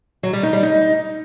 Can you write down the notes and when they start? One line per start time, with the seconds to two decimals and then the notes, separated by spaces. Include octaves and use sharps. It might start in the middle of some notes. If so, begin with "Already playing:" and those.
0.23 F#3
0.33 G3
0.43 D#4
0.53 G3
0.63 D#4